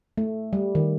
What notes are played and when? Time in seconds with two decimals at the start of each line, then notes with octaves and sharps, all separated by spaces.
0.18 A3
0.53 G3
0.75 D#3